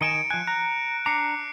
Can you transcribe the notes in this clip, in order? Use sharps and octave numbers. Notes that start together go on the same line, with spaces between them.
D#3 D#5 G#5 C#7 D7 E7
F3 G#5 F#6
A#5 F#6
D4 A#5 D6 C7 C#7